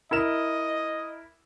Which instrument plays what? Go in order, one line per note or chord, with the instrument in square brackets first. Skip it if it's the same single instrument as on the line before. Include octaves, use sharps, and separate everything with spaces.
[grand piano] E4 A#4 E7 [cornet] D#5